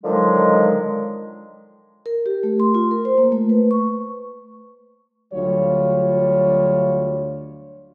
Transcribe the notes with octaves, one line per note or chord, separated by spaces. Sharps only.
D3 D#3 F3 F#3 G#3
A#4
G4
A3
C6
F4
A#4
C5
A#3
A3
B4
C#6
D2 F#3 G3 F4 C#5